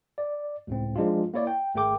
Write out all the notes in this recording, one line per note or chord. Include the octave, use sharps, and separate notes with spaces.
D5
C#2 A2 C4
F3 G#3 D4 D#4 F4
A#3 E4 C#5 D5
G5
G#1 A3 G#4 A#4 G5 D6